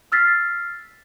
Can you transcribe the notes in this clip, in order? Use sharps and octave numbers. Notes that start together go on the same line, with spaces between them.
E6 F6 A6 B6 C7